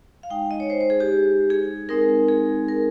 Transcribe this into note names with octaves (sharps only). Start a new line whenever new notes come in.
F5
G#3 D#4 G5
D#5
C#5
C5
C5
G#4
G4
G#4
G#3 C4 D#4 A#4
G#4
A#4